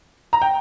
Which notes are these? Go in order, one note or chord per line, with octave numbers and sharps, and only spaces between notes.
A#5
G5